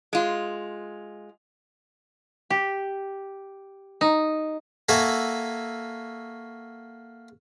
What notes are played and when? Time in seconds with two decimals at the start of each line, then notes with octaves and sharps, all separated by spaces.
0.13 G#3 F4
2.50 G4
4.01 D#4
4.89 A#3 F#4 A4 E5 G#5